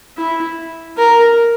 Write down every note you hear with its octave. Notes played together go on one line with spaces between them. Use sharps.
E4
A#4